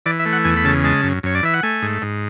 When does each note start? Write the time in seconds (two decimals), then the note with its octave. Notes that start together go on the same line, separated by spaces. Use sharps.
0.06 E3 D5
0.19 E5
0.26 A3
0.33 F#5
0.44 E2 G#5
0.57 B5
0.64 C#3 A5
0.84 G#3 A5
1.03 F#2
1.23 F#2 C#5
1.35 D5
1.43 E3 E5
1.54 F#5
1.63 A3 G#5
1.82 G#2
2.02 G#2